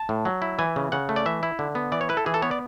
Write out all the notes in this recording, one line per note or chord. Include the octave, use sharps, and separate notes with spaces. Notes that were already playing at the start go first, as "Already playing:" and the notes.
Already playing: A5
A2
F#3
E4
E3 G#5
C#3
C#3 F#5
A3
D5
E3 E5
E4
D3
B3
E3 D5
C#5
E4 B4
A4
E3 G#4
A4
B3 C#5
D5